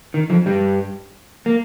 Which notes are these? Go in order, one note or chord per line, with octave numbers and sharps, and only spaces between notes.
D#3
F2 F3
G2 G3
A#3